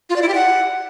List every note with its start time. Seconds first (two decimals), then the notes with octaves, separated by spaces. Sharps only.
0.10 F4
0.16 D5
0.22 E4
0.28 G4
0.35 F#5